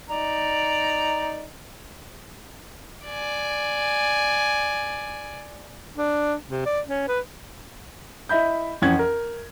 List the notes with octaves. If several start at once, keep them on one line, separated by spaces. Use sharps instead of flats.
D#4 D5 A#5
D5 G#5
D4
C3
D5
C#4
B4
E4 D#5 E5 B5 G6
F2 E3 C#4 F#5 G#6
A#4